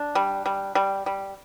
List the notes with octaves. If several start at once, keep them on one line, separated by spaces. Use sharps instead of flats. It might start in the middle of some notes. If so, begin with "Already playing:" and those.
Already playing: D4
G3
G3
G3
G3